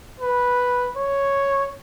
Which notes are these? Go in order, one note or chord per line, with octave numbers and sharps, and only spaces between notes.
B4
C#5